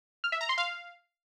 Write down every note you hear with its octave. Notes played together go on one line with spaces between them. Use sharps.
F6
E5
A#5
C6
F5